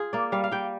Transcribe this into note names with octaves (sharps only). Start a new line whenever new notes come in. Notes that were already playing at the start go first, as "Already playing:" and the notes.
Already playing: F4 G#4
A#3 D5
G3 F5
F5
G3 G5